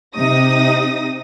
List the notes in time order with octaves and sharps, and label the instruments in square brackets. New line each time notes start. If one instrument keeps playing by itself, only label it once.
[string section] C3 D#4 D#6 A#6